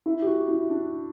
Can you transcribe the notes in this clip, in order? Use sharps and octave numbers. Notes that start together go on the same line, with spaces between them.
E4
G4
F#4
E4
D4